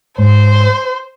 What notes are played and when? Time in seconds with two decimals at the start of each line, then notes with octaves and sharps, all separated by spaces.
0.18 G#2 C5